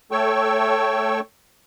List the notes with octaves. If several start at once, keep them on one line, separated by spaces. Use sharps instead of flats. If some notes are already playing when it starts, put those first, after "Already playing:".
A3 A4 C#5 G5 C#6 E6